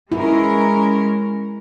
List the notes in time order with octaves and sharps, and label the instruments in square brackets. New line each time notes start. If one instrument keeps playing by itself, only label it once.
[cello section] G#3 C#4 A#4 [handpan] E4